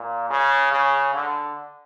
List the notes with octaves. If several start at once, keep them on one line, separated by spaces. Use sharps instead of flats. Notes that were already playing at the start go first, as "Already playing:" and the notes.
Already playing: A#2
C#3
C#3
D3